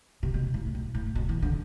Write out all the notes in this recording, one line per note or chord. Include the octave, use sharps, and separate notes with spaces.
C3
B2
A2
B2
A2
B2
E3
D3